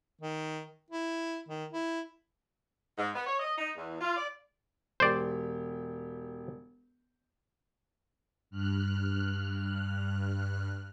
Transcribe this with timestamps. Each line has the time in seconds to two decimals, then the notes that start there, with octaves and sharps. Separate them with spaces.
0.21 D#3
0.90 E4
1.49 D#3
1.73 E4
2.97 G#2
3.14 B3
3.25 C#5
3.39 D#5
3.58 D#4
3.75 E2
4.00 F4
4.16 D5
5.00 E1 G4 C5 D5
8.50 G2 F6 F#6